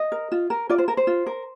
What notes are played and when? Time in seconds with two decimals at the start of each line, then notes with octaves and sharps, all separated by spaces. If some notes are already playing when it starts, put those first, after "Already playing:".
Already playing: D#5
0.12 A#4
0.32 F4
0.50 A#4
0.70 F4 D5
0.78 C5
0.88 A#4
0.97 C5
1.07 F4
1.26 A#4